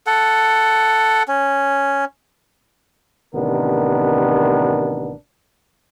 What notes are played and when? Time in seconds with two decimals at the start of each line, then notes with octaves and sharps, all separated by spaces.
0.07 A4 F#5
1.28 C#4
3.34 A1 C3 D#3 B3 D4 A#4